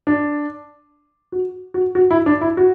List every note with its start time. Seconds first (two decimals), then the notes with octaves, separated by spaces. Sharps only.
0.07 D4
1.32 F#4
1.74 F#4
1.95 F#4
2.11 E4
2.26 D4
2.41 E4
2.57 F#4